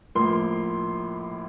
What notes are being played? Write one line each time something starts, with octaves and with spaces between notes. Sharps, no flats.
A#1 A2 F3 A#3 C6